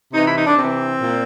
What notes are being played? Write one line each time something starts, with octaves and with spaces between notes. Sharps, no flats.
C3 E3 D#4
E4
D#4
D4
C3 E3 C4
A#2